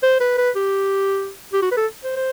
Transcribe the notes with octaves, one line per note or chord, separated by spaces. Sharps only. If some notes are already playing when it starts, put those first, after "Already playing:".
C5
B4
B4
G4
G4
F#4
B4
A4
C5
C5